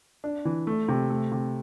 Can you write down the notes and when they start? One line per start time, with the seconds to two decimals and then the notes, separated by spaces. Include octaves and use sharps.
0.24 D4
0.45 E3
0.67 A3
0.88 C3
1.10 A3
1.32 C3